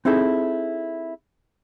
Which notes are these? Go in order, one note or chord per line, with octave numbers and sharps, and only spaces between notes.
C4 D#4 E4 G#4 A4